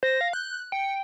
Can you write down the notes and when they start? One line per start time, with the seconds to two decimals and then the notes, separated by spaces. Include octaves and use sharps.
0.03 C5 A#6
0.21 F5
0.33 F#6 G6
0.72 G5 C#7